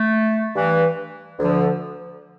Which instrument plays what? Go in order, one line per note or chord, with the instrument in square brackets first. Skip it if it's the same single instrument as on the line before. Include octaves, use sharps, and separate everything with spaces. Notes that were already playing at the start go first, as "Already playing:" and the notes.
Already playing: [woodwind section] A3
G2 E3
D2 D3 F3